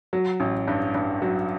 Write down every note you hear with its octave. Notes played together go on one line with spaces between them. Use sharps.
F#3
A1
G2
G2
F#3